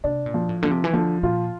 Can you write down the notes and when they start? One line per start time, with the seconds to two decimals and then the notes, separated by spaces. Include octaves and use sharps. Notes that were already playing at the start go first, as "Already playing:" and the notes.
0.04 C3 D4
0.26 A#2
0.34 F3
0.49 A2
0.63 D3 F3
0.71 C3
0.84 E3
0.93 D3 F3
1.23 A#2 F4